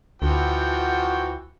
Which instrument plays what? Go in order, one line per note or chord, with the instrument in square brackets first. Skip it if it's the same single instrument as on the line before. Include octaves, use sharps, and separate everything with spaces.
[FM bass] D2 [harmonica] E3 F3 G5 [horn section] F#4